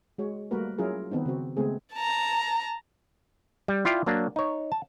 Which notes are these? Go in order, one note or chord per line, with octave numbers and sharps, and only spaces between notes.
G#3 F#4 C#5
G3 A3 A#3 F#4 A#4 B4
F#3 C#4 E4 F4 G#4 A#4
D#3 B3 C4 D#4
C#3 C4 F#4
C#3 G#3 A3 B3 C4 G#4
A5 A#5
G3
E4 F4 D5 F5 G5
F#3 A#3 D4
D#4 C#5
A5